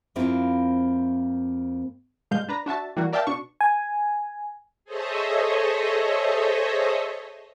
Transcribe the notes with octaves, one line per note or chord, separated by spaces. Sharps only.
F2 A#3 C4 E4 F4 A#4
G2 B2 G#3 F5 G6
D4 B4 A#5
D4 F#4 E5 A5
E3 G3 A#3 F#4
A#4 D5 E5 F5 G5 A5
B2 D4 C#6
G#5
G#4 A4 C5 C#5 D#5 E5